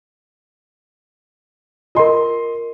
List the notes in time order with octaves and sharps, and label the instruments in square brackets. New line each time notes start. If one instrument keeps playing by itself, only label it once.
[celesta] F4 A#4 [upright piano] D#5 C6